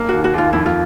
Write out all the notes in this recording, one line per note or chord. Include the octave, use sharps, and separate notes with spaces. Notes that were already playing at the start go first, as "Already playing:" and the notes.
Already playing: B1 A#3
D#2 F#4
F#4
D#2 F4
F2 E4
F4